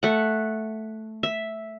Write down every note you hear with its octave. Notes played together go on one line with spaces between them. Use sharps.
A3 F#5
E5